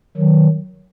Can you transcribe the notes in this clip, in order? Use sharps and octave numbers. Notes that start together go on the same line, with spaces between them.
D#3 F#3